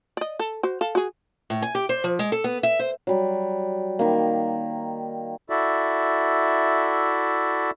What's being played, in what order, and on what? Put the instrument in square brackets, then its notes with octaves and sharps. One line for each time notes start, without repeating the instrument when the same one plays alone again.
[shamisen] D5 D#5
A4
F#4 C5
A4 F5
F#4 G#4
[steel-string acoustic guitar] A2
G#5
G4
C5
F3
G#3
A4
B3
E5
C5
[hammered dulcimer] F#3 G3
D#3 G3 A#3
[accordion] E4 F#4 A4 D5 E5